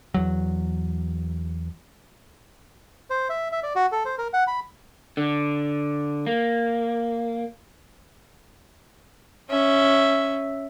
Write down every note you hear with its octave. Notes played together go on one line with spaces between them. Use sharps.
E2 F#3
C5
E5
E5
D5
F#4
A4
C5
A#4
F#5
B5
D3
A#3
C#4 E5